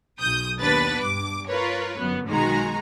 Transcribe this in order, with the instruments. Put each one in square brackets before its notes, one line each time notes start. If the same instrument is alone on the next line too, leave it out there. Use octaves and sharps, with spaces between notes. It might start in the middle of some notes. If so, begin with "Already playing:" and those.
[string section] B1 D#6 G6
D#2 B3 D4 B4 A6
G2 D6
F4 A#4 B4 C#5
G1 F#2 B3
B1 D#3 G#3 F#4 G#5 A#5